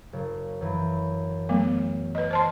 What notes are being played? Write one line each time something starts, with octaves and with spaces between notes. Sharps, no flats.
F#1
F#2 E3
F#3 A3 B3
B4 D#5
C5 A5 C6 F6